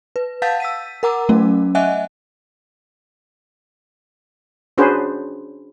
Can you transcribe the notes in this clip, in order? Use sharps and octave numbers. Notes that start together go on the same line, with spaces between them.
B4
F5 F#5 A5 G6 A6 B6
E6 B6 D#7
A#4 F#5 A#5 D6 E6
F#3 A3 C#4
D#5 E5 F#5 G#5 F#6
C#4 D4 F#4 G#4 B4 C5